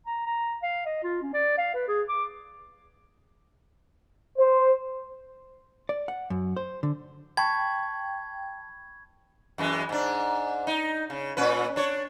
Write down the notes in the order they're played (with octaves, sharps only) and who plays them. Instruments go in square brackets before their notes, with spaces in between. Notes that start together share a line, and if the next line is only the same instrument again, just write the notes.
[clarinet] A#5
A#5
F5
D#5
F4
C#4
D5
F5
B4
G#4
D6
[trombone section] C5
[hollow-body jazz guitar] D5
F#5
F#2
C5
D3
[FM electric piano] G5 [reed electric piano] A5 [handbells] B5 C#6 [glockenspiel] G#6
[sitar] F#2 E3 G#3
G#2 D4
D#4
C#3
A#2 C#4 B4
D4 C#5